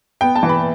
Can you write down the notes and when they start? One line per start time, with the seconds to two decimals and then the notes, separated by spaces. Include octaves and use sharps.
0.21 B3 G5
0.36 A5
0.43 E3
0.49 B5